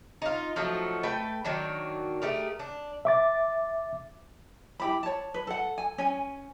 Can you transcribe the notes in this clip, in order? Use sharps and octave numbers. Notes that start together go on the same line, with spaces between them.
D#4 F4
F3 F#3 A3 D#4
A3 B4 G5
D#3 F#3 A#3 D4
A3 G4 G#4 A#4
D4
E5 D6 A6
E4 G4 B5
C#5 A5
B4
A4 F#5
G#5
C#4 G#5